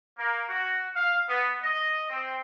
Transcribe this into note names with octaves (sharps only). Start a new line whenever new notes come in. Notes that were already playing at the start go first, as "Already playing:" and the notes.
A#3
F#4
F5
B3
D#5
C4